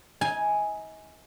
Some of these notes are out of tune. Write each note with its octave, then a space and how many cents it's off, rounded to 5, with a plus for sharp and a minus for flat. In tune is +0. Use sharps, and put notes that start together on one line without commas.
D#4 +40 G#5 +0